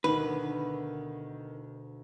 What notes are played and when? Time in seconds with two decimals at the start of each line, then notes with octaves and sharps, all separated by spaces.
0.04 D2 B2 D#3 B4